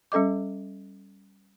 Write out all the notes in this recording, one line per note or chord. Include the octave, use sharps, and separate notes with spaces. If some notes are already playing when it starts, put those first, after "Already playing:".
G3 C#4 A4 D#5 D6